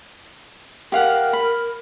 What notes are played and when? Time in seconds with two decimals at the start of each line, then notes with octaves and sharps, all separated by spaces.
0.92 G4 A#4 F5 F#5
1.33 B5